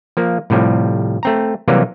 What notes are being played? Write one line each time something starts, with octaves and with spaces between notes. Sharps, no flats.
F3 A#3
A2 C3 F3 G3
A3 C4 A#5
C3 E3 F#3 G3 A#3